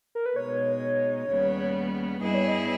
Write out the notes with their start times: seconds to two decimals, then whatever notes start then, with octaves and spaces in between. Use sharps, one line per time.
0.15 A#4
0.26 B4
0.36 B2 G#3 D#4 C#5
1.28 D#2 C#3 G3 B3
2.21 G2 G3 B3 E4 G#4 D#5
2.35 C#5
2.48 D#5